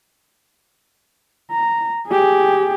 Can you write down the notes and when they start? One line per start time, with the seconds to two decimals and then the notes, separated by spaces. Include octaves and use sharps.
1.51 A#5
2.09 G4 G#4